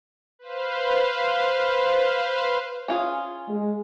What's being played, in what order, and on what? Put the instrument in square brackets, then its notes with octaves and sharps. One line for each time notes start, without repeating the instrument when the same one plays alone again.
[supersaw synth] B4 C5 F5
[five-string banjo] C#4 F4 G#4
[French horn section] G#3